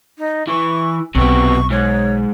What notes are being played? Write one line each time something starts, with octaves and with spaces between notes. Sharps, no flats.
D#4
E3 C#6
B1 C3 F#3 B3 C#6
G#2 C#5